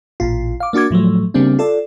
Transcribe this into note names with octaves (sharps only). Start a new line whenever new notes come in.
A1 A#2 F4
F5 D6
A#3 D4 F#4 D6 G#6
A2 F3 F#3 A3
C#3 G3 A#3 C4 D4
F4 A4 D5